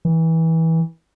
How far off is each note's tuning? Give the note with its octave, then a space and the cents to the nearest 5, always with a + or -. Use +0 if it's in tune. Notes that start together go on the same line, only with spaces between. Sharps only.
E3 -20